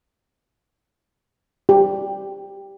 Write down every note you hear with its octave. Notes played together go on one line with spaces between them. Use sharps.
G4